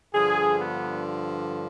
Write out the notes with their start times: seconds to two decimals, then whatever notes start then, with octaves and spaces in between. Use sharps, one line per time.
0.13 G2 D3 F3 G#4
0.58 B3